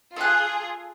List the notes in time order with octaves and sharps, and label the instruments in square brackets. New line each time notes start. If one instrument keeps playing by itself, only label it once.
[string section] F4 G#4 [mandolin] A4 F#6